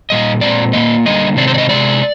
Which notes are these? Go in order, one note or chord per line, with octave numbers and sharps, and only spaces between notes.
A#2 G3 D#5
A#2 G#3 C4 D5
A#2 F3 A#3 D#5
D3 G3 A#3 D#5
C3 D#3 G#3 C4 D5
C5
D5
D#5
C3 F3 G#3 D5